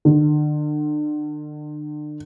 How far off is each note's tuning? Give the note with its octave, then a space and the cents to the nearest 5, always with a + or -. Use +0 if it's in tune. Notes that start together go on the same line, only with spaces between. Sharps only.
D3 +40